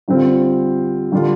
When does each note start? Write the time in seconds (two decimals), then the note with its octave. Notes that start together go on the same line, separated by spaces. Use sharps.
0.08 D3 G3 C4 F4
1.12 D3 G3 D4 F4